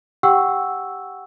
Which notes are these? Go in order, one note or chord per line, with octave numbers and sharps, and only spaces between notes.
G4 F#5 G5 C#6 E6